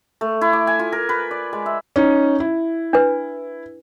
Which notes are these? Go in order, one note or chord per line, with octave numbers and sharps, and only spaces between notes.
A3
E4
D6
G#5
F4
A#4
B4
D5
G#3
E5
C#4 D#4
E4
D4 B4